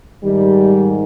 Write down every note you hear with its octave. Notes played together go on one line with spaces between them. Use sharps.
G#2 D#3 G3